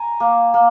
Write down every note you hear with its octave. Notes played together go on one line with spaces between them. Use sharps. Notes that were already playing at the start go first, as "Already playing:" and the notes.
Already playing: G#5 A#5
A#3
A#3